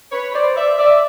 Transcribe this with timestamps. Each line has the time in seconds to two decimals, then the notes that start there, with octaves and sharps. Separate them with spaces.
0.12 B4 C#5
0.34 C5 D5
0.56 D5 E5
0.78 D5 E5